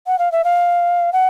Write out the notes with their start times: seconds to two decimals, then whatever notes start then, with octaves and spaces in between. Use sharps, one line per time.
0.07 F#5
0.19 F5
0.32 E5
0.44 F5
1.13 F#5